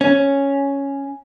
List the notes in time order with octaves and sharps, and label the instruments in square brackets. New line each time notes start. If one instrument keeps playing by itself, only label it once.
[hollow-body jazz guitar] C#4